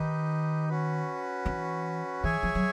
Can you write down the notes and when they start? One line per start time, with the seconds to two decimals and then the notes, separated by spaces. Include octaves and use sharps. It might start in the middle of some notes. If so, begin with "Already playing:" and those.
Already playing: D#3 D#4 G4 B4 D#5
0.69 C#4 F#4 B4
1.46 E3
2.24 E3 G#4 C#5 E5 G#5
2.43 F3
2.55 F#3